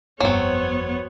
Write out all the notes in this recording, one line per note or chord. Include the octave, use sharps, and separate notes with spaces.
G1 F2 F#3 B3 C4 C#5